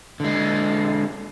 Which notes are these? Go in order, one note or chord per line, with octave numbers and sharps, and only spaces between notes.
D3 G#3